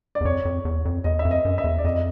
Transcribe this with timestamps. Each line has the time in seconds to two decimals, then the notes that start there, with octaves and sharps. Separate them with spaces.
0.15 D5
0.21 E2
0.25 F2 C#5
0.45 F2
0.65 E2
0.85 F2
1.04 E2 D#5
1.19 E5
1.25 F2
1.31 D#5
1.45 F#2
1.58 E5
1.64 E2
1.79 D5
1.84 F2 D#5
1.95 D#5